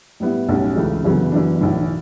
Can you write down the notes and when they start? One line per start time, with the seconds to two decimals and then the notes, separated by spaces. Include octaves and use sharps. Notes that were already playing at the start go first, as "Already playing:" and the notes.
0.20 A2 G3 B3 E4
0.49 B1 A2 G3 C#4
0.76 C#2 C#3 E3 A3
1.04 G1 F#2 C#3 E3 B3
1.32 F#2 E3 B3 D4
1.61 B1 A2 E3